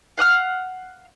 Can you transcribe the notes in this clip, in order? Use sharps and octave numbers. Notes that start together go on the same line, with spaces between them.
F5 F#5 D#6 F6